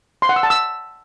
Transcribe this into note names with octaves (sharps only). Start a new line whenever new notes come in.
C6
F#5
E6
A5
E6